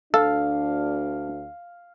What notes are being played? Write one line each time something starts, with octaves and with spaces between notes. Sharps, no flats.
D2 D4 A4 F5